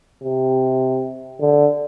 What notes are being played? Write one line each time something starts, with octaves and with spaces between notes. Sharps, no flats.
C3
D3